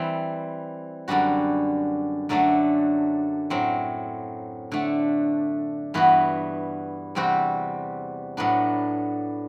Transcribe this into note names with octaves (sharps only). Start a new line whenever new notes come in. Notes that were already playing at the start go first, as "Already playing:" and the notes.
Already playing: E3 G3 C4
F#2 D3 G3 D4 F#4
F#2 D3 F#3 A3 D4
A2 F#3 C4
D3 A3 D4
G2 E3 B3 F#4
E2 C3 G3 C4 F#4
A2 F#3 B3 D4